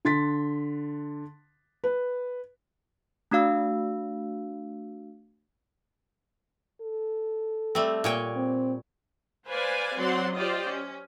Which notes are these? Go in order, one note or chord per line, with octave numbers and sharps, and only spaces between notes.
D3 C6 A6 B6
B4
A3 D4 F#4 F5 E6
A4
G3 A3 C4
A#2 C#5 G5
C4
B4 C5 D5 F5 G#5
F#3 C4 F#4 D5 F#5 C6
F4 G4 C5 D5 D#5
C#4